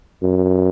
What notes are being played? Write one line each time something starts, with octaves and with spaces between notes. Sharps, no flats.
F#2